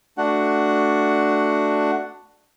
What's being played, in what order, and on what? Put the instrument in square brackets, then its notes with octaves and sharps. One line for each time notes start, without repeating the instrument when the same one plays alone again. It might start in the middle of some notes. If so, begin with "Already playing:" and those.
[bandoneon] A3 D4 F#4 F#5